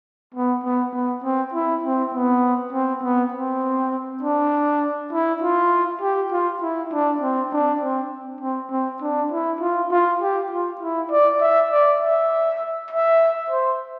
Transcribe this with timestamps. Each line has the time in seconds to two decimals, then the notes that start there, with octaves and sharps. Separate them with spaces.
0.34 B3
0.64 B3
0.93 B3
1.24 C4
1.54 E4
1.84 C4
2.14 B3
2.73 C4
3.03 B3
3.34 C4
4.23 D4
5.13 E4
5.42 F4
6.02 G4
6.32 F4
6.62 E4
6.93 D4
7.21 C4
7.52 D4
7.81 C4
8.41 C4
8.71 C4
9.02 D4
9.32 E4
9.61 F4
9.91 F4
10.22 G4
10.51 F4
10.81 E4
11.11 D5
11.40 E5
11.71 D5
12.01 E5
12.91 E5
13.50 C5